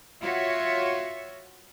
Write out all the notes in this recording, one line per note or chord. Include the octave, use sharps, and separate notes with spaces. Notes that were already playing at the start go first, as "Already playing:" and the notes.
F4 F#4 C#5 E5